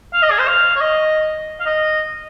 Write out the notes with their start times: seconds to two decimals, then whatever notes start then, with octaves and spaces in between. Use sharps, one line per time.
0.13 F5
0.22 D#5
0.31 G#4
0.39 C5
0.48 F5
0.76 C#5
0.81 D#5
1.60 F5
1.66 D#5